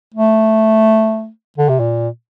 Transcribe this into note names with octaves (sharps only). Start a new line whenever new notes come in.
A3
D3
C3
A#2